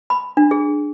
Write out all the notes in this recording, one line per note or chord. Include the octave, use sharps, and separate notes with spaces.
B5
D4
G#4